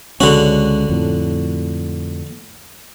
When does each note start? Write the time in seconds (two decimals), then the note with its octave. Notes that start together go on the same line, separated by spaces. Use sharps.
0.20 C#2 D3 G#3 C#4 F#4
0.89 F2 A2